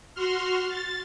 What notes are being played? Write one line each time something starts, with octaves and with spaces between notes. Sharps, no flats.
F#4 C6 F6
A6